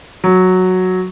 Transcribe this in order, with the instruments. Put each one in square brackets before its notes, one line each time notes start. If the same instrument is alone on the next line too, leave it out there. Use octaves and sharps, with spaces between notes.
[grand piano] F#3